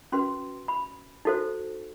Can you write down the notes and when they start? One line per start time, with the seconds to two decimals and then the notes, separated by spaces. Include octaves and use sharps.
0.12 C#4 F#4 B4 C6
0.68 B5
1.25 D#4 F#4 A4 C5